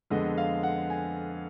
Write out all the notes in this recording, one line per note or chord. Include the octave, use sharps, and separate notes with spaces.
F2 D3 G#3 B3 D#5
F5
F#5
G#5